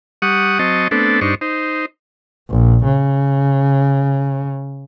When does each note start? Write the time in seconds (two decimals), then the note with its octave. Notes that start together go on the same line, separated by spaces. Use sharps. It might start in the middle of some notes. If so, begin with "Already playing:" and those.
0.22 G3 F#5 C#6 D#6
0.59 F#3 C4 D#5 A5 C#6
0.91 A3 B3 C4 D4 A4
1.21 G2 D4 D#4 C5 C#6
1.41 D#4 C5
2.50 A#1
2.84 C#3